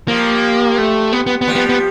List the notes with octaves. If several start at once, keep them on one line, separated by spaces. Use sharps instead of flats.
F3 G3 A#3
A3
B3
B3
B3
F3 G3
B3
B3